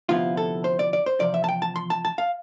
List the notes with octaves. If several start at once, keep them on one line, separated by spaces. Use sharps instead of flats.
D2 C3 F3 B3 E4 F4
A4
C5
D5
D5
C5
E2 C3 F3 D5
E5
A5
G5
A5
C6
A5
A5
F5